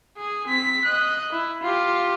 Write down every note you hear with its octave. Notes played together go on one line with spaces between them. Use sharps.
G#4
C4 B6
D#5 F#6
E4
F4 G4